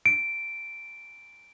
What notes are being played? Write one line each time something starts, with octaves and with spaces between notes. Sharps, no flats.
D7